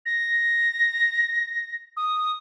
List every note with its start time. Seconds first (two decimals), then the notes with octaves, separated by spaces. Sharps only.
0.06 A#6
1.97 D#6